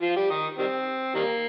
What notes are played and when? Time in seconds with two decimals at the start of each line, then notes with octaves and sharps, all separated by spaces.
0.02 F3 F4
0.16 G3 G4
0.30 D#3 D#4
0.59 D#3 G3 C4
1.15 D#3 G3 A#3